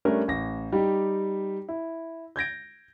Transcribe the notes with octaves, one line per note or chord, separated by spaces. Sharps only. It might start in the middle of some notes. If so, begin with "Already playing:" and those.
G3 A3 C#4 D4 A#4
A1 A#6
G3 D#4 G4
E4
G6 G#6 A#6 D7